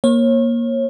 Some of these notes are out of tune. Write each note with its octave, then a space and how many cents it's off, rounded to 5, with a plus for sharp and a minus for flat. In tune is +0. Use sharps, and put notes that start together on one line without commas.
A#3 +15 C#5 -30